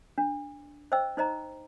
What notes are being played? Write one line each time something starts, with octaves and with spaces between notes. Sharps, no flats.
D4
C5 D#5 G5 E6
D#4 C5 D#5 A#5